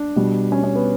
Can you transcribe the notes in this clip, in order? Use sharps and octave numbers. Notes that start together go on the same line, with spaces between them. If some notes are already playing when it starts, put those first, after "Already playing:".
Already playing: D4
B2 G3
C#4
C#4
B3